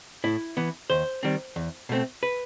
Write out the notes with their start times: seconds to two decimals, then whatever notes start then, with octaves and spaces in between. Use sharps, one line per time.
0.24 A2 E4
0.57 E3 B3
0.90 D#2 C5
1.23 D#3 G3 C4
1.56 E2
1.89 B2 A3 C4
2.23 B4